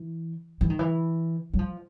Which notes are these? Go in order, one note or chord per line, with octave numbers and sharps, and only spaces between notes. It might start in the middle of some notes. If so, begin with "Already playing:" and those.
Already playing: E3
E3
D#3
E3
F#3
F3